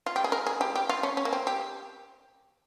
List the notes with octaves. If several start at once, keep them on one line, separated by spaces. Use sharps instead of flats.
F4
G4
G#4
A#4
G#4
G4
G4
F4
C#4
C#4
A#3
C4
G4